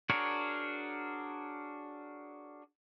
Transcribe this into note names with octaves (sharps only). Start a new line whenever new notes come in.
D4 F#4 G#4 A#4 C#5